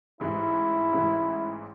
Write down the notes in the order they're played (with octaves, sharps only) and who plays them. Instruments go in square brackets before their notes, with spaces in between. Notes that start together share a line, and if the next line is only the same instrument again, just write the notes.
[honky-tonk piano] A1 G#2 E3 [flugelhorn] E4
[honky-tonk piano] A1 G#2 E3